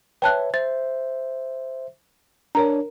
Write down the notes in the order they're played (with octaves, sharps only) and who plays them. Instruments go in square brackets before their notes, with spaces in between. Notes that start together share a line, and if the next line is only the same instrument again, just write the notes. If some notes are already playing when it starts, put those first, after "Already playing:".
[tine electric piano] B4 C#5 E5 [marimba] G5 A5 F#6
[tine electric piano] C5 E5 [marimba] A6
[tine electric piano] D4 C#5 [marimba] A#4 A#5